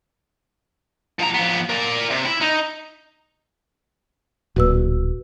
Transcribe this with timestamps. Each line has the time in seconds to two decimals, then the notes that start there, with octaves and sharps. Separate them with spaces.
1.19 F3 A#5
1.34 F3 B3
1.69 A#4 D5
2.10 C3
2.25 E4
2.41 D#4
4.56 D1 A#2 F#4 B4 E6